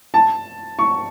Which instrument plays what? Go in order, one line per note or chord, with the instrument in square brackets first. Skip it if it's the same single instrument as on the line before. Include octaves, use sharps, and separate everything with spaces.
[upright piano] A5
C#6